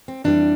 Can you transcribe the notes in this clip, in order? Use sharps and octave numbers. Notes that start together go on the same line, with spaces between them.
C4
F2 E3 G3 D4